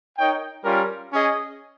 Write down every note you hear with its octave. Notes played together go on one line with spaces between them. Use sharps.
D#4 A#4 C#5 G5
G3 C#4 F4 A#4
C#4 G#4 D#5